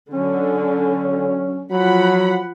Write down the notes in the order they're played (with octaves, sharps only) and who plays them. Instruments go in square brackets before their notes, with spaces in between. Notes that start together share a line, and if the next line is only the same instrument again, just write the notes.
[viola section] D3 [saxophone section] F#3 C#4
[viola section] F3 F#5 B5 [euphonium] F#3